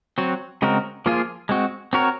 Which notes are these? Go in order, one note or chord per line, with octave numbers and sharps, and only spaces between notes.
F#3 C4 F#4
C#3 G#3 C4 F#4 A#4
F3 A#3 F4 G#4
G#3 C4 F#4
C4 F#4 A#4 C#5